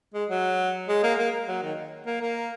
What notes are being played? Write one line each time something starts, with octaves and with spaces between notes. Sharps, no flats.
G#3
F#3
G#3
A#3
A#3
F#3
D#3
A#3
A#3